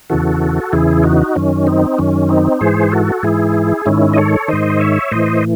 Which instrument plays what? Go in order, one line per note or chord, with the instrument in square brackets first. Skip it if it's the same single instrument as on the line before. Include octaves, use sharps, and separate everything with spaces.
[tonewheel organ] E2 C#3 E3 F#4 A4
E2 C#3 E3 E4 G#4
D#4 F#4
F#2 D#3 C#4
C4 D#4
F#2 D#3 C#4
C4 D#4
G#2 E3 G#4 C5
F#4 A4
G#2 E3 E4 G#4
G#2 D#3 C#4 E4
D#5
A4 C#5
G#2 D#3 C5 D#5
C#5 E5
A2 E3 C5 D#5